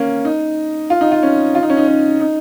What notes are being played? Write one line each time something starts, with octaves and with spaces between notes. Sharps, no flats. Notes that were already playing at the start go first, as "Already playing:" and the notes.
Already playing: A#3 C#4
D#4
F4
D#4
F4
C#4
F4
D#4
C#4
D#4
C#4
D#4